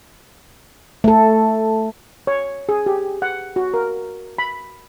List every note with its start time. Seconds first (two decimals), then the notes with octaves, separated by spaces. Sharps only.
1.04 A3 A4
2.27 C#5
2.69 G#4
2.86 G4
3.22 F#5
3.56 F#4
3.74 A#4
4.38 B5